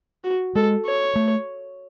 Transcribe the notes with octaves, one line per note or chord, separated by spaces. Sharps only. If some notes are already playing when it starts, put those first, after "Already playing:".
F#4
G#3 A4
C#5
A3